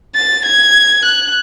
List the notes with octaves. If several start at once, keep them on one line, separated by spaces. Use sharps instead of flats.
A6
G#6
F#6